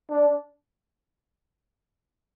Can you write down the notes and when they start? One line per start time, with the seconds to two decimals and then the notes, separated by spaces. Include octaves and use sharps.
0.11 D4